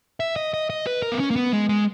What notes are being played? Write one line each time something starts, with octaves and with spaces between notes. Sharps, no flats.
E5
D#5
D#5
D#5
B4
A#4
B3
C#4
A#3
B3
G#3
G#3